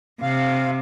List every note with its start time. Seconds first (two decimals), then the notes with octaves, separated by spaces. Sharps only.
0.22 C3 F5